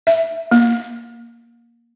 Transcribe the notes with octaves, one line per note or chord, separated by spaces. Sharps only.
E5
A#3